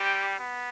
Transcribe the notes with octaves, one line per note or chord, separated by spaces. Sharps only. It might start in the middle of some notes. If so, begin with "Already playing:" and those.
Already playing: G3 C4 G4
B3